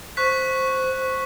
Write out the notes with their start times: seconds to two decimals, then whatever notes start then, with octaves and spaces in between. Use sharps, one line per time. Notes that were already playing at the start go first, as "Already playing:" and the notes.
0.17 C5 C#6 F#6 B6